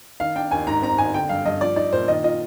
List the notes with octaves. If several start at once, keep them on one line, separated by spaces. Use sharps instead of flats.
D#3 F5
D4 G5
D#2 G#5
G#2 A#5
C4 A#5
G#1 G#5
D3 G5
G2 F5
G2 D#5
F3 D5
D#4 D5
A#2 C5
D#3 D#5
F4 D#5